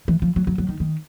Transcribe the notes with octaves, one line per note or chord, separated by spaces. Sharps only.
E3
F3
F#3
F#3
F#3
D#3
D#3